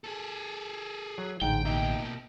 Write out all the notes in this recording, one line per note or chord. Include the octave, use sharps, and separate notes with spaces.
G#4 A4
F#3
A1 G#2 D3 G5
B2 A#3 D#4 G4 E5